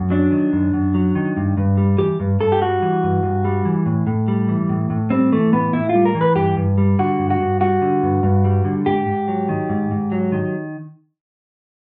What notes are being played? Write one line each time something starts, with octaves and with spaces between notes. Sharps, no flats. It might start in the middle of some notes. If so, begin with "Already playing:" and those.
Already playing: F#2
F#3 D4
D#3
F#2
F#2
F#3
D#3
G2
G2
G3
E3 G4
G2
G2 A4
G4
G3 F#4
E3
G2
G2
G3
E3
A2
A2
G3
E3
A2
A2
G3 C4
E3 A3
A2 B3
A2 E4
F4
G3
A#4
E3
B4
G2 G4
G2
G3
D3 F#4
G2
F#4
G2
G3 F#4
D3
G2
G2
G3
D3
G#2 G4
G#2
F#3
D#3
G#2
G#2
F#3
D#3